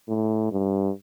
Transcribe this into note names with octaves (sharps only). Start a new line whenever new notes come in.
A2
G2